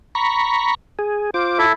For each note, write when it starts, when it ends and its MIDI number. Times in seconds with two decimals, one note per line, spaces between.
0.15 0.75 82
0.15 0.75 83
0.15 0.75 85
0.99 1.30 68
1.34 1.66 65
1.34 1.58 72
1.34 1.66 86
1.59 1.72 64
1.59 1.72 69
1.59 1.72 76